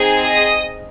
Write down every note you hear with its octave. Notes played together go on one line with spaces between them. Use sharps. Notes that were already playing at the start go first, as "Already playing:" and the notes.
Already playing: C4 D#4 G#4
D#5 D#6